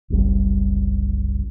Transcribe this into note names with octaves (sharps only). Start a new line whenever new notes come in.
F#1 C2 G3